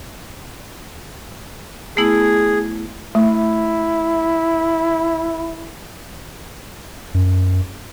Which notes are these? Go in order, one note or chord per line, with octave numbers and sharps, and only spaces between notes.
A3 B3 E4 G#4
A3 E4
F#2